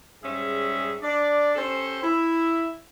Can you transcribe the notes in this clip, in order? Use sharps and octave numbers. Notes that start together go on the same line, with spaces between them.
G#2 G3 C#4 G#4 E5
D4 D5
C#4 G4 A4 C5
E4